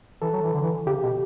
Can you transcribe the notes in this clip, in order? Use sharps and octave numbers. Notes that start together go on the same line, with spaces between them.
E3 A4
F#3
E3
D3
E3
C#3 G4
B2